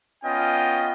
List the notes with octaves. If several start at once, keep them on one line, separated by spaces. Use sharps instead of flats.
B3 C#4 F4 D#5 G5